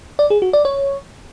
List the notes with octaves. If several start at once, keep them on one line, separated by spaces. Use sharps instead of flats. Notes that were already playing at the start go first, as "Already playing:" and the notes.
D5
G#4
F#4
D5
C#5